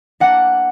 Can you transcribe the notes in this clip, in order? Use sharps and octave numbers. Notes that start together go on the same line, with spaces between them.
A#3 D4 F#5